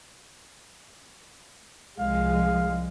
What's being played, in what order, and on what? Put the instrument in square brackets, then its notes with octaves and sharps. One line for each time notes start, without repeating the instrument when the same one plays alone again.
[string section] C2 F3 G#3 [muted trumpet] F5